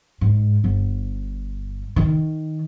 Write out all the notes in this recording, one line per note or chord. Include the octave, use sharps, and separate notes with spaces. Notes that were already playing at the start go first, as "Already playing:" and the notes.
G#2
G1
D#3